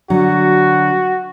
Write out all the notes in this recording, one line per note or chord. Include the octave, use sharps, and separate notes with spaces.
D3 F#3 F#4